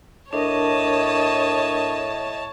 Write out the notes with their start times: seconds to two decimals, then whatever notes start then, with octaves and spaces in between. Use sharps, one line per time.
0.33 A2 D4 A#4 C#5 D#5 A5